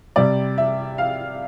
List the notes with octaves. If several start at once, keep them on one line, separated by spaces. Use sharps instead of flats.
C3 G3 D5
E5
F5